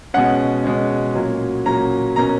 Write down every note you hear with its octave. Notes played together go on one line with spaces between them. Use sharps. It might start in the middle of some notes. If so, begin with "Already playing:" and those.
B2 G#3 C#4 F#5
B2 G#3 C#4
A#2 F#3 C#4
A#2 F#3 C#4 A#5
B2 F#3 A#3 C#4 A#5